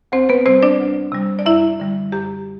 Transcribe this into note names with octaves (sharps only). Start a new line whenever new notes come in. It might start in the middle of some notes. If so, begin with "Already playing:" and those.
D2 C4 C5
B3 B4
C3 G3 C4 C5
D4 D5
D2
C3 G3
D5
F#2 E4 E5
D3 G3
F#2 G4